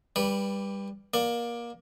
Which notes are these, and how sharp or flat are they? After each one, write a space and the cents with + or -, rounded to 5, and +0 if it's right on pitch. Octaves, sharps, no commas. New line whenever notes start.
G3 +20 B4 -15 D5 -5
A#3 +20 D5 +10